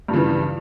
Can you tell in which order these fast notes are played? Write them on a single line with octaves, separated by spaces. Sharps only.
G2 F3 C#3 E3